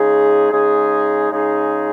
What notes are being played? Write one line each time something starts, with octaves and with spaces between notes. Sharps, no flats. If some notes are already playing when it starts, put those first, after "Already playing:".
Already playing: C#3 G#3 D#4 G#4
C#3 G#3 D#4 G#4
C#3 G#3 D#4 G#4